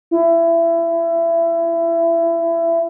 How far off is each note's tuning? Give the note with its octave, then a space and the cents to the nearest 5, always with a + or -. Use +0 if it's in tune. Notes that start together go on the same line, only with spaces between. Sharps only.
E4 +25